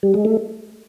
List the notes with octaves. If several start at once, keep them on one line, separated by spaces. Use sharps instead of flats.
G3
G#3
A3